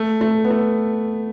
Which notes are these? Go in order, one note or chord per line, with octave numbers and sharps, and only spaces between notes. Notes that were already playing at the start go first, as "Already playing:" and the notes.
Already playing: A3
A3
B3
A3